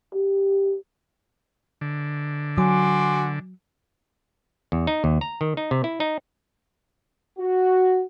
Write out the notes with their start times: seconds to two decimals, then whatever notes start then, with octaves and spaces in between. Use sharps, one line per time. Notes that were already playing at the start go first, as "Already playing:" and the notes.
0.14 G4
1.81 D3
2.58 F#3 F#4 G#5 C6 D6
4.72 E2
4.87 D#4
5.04 D#2
5.21 A#5
5.41 D#3
5.57 D#4
5.71 C3
5.84 E4
6.00 D#4
7.39 F#4